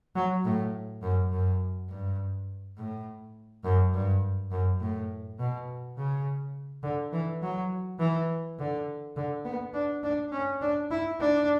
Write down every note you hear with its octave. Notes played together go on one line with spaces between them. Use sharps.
F#3
A2
F#2
F#2
G2
A2
F#2
G2
F#2
A2
B2
C#3
D3
E3
F#3
E3
D3
D3
B3
D4
D4
C#4
D4
E4
D4